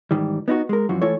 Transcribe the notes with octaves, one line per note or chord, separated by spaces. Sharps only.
G#2 D#3 E3 G3
B3 D#4 E4 F#4
G#3 A#4
F#2 E3 F3 F#4
E3 A3 E4 F4 A4 C#5